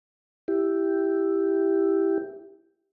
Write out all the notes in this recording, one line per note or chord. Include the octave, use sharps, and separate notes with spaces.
E4 G4